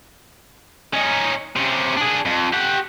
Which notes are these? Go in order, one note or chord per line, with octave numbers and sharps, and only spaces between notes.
C#4 D#4
C3 C#4
D4 G#4
F2
G4 F#5